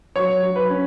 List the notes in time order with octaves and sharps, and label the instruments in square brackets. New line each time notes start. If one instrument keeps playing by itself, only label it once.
[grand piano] F#3 [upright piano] C#5
[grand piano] F#3
[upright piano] B4
[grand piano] C#4